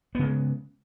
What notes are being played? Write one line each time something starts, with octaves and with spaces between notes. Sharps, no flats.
C#3 G#3 B3